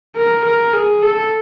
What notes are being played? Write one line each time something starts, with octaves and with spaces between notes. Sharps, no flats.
A#4
A#4
G#4
A4